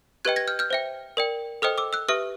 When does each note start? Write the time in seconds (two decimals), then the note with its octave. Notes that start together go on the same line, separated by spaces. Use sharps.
0.25 G4 B4 D#5 G5 F#6 G#6
0.36 G#6 A#6
0.48 F6 G6
0.59 F6 G6
0.70 C5 E5 G5
1.17 A#4 D5 G5
1.62 A4 C5 D#5 G5 D#6 F6
1.78 D6 E6
1.93 E6 F#6
2.08 G4 B4 E5 D#6 F6